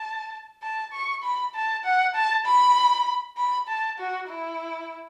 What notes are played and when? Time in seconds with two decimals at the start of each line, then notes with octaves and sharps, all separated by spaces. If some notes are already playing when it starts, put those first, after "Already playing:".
Already playing: A5
0.62 A5
0.93 C#6
1.23 B5
1.54 A5
1.84 F#5
2.15 A5
2.45 B5
3.37 B5
3.68 A5
3.98 F#4
4.29 E4